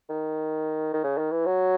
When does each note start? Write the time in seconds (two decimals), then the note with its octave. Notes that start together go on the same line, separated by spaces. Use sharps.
0.10 D#3
0.94 D#3
1.04 C#3
1.18 D#3
1.31 E3
1.46 F#3